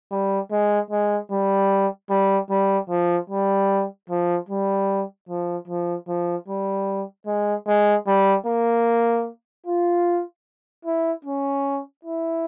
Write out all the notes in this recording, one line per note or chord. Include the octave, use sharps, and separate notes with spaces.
G3
G#3
G#3
G3
G3
G3
F3
G3
F3
G3
F3
F3
F3
G3
G#3
G#3
G3
A#3
F4
E4
C#4
E4